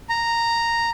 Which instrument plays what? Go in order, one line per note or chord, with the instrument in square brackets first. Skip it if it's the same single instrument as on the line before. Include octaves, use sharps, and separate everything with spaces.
[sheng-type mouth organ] A#5